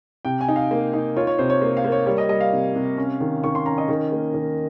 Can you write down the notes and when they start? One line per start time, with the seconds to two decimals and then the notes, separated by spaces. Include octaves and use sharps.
0.25 C3 G5
0.41 G#5
0.48 D#4
0.56 F5
0.71 A#3
0.93 D#4
1.17 F4 C#5
1.27 C#5
1.39 C3 C5
1.50 C#5
1.61 A#3
1.77 F5
1.84 A#3
1.92 C#5
2.06 G3 C#5
2.18 D#5
2.29 G3 D#5
2.41 F5
2.53 C3
2.76 C3
2.98 C#4
3.20 D#3
3.44 D#3 C#6
3.55 C6
3.66 C#4 A#5
3.78 D#5
3.89 D#3
4.12 A#3
4.34 D#3